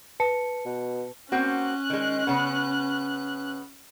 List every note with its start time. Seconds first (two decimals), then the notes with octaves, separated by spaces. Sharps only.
0.20 B4 A5 C#7
0.65 B2
1.32 A#3 C4 C#4 F#4 F#6
1.90 D#3 G#3
2.27 C#3 B3